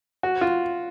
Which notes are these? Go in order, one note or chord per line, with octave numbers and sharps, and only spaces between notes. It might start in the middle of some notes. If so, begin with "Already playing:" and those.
F#4
F4